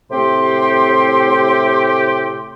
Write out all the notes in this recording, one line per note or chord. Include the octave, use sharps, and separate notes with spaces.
A2 C3 A3 C4 G4 C6